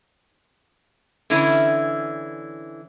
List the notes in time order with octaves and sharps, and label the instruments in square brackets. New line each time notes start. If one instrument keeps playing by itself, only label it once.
[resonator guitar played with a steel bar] D3 E3 C#4 E4